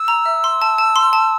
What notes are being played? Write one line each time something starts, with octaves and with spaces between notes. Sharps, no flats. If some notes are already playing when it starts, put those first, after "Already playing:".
Already playing: E6
A#5
E5
C6
A5
A5
C6
A5